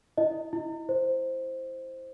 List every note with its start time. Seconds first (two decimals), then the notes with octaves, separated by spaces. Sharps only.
0.18 E4 D#5
0.53 E4
0.89 C5